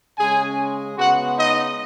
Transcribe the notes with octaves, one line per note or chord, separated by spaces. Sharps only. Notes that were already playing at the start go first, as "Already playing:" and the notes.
C#3 G#3 C#4 G#4 G#5
C#3 G#3 B3 F#4 F#5
D#4 D#5